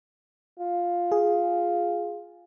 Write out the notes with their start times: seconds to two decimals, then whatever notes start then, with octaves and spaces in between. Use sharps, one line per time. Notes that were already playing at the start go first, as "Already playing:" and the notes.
0.59 F4
1.12 G#4